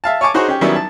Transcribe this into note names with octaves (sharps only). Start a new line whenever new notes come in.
E5 F5 A5
C#5 G#5 A5 C#6 D6
D#4 F#4 G#4 C5 C#5
C#4 G4
D#3 F#3 G3 B3 C#4 E4
A5